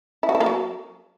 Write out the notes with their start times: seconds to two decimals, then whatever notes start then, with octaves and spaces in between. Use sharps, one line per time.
0.23 E4
0.29 F#4
0.35 E4
0.40 A#3
0.46 F#3